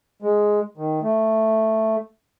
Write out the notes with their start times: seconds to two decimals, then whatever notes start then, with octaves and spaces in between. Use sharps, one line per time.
0.22 G#3
0.77 D#3
1.02 A3